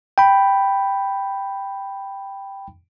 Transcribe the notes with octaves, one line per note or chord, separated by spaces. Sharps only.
G5 B5